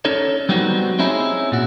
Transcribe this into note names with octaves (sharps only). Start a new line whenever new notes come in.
C#4 D#4 A4 C#5 D5
F#3 G3 B3 C4 D#4 F#4
C4 C#4 D#4 E4 G#4
A#2 F#4